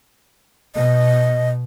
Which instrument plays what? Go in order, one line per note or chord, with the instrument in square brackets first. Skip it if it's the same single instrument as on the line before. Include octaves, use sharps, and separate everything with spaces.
[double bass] B2 [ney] D#5